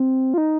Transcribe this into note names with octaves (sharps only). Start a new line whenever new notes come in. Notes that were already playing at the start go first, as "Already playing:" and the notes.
Already playing: C4
F4
D#4